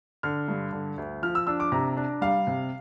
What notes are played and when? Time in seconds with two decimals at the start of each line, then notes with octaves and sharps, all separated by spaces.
0.23 D3 F6
0.48 G2
0.72 D3
0.98 D2
1.22 F3 F6
1.35 E6
1.47 D4 E6
1.60 D6
1.72 C3 A#5
1.97 D4
2.21 G3 F5
2.47 C3